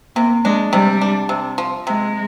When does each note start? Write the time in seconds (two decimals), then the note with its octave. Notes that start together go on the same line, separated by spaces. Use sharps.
0.16 C3 A#3
0.45 G#3 D4
0.72 C3 G3
1.01 D4
1.29 C3
1.58 F3
1.87 C3 G#3